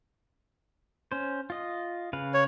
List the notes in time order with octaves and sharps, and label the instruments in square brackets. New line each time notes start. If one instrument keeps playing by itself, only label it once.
[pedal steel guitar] C#4 C5
F4 D#5
C#3 B4 F5
[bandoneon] C#5